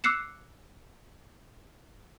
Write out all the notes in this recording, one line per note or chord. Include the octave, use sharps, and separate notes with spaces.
D6 E6 F#6 C7 C#7 E7